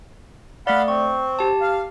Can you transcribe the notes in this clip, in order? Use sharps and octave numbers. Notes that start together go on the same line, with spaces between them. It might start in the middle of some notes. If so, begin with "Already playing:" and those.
A3 D5 F5 F#5 B5
C4 C#6
G4 A5
F5